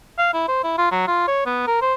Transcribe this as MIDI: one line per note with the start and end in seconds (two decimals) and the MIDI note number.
0.18 0.29 77
0.33 0.48 64
0.48 0.63 72
0.64 0.77 64
0.78 0.87 65
0.91 1.06 54
1.07 1.25 65
1.28 1.43 73
1.46 1.65 59
1.67 1.77 70
1.82 1.94 72